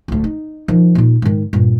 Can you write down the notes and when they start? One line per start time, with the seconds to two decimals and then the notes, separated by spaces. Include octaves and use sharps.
0.08 D1 D2
0.24 D#4
0.68 D#3 F3
0.95 A#2 D#4
1.22 G#2 D#3
1.53 G2 A#2